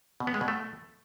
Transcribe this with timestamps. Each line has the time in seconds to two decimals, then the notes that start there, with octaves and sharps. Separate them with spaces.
0.20 B2
0.27 B3
0.34 G#3
0.41 B2
0.48 A3